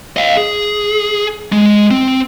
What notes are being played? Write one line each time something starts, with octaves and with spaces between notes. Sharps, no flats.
D#5 F5
G#4
G#3
C4